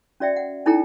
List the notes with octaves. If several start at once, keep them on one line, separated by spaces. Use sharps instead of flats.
C#4 F#4 D5 E5 G5
F#5
C#4 D#4 E4 A4 G5 A#5